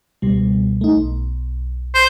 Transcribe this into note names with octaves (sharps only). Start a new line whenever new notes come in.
C#2 B2 G3
A3 D#4
B1
C5